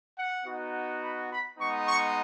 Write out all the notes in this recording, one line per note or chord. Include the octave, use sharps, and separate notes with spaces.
F#5
B3 D#4 F#4
B5
B5
G#3 B3 D#4 C#6
C#6